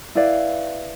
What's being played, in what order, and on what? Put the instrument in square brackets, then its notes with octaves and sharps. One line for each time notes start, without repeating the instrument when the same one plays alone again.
[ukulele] E4 B4 D5 F5